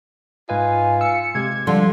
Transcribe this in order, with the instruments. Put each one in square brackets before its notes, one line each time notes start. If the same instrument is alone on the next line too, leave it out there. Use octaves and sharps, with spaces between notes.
[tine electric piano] G#2 B4 D#5 [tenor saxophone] F4 [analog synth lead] G#5
[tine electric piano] E6 [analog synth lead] C#7
[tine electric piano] C3 G#3 G4 [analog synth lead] G#6
[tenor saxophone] D3 [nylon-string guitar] F3 G3 [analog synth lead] C6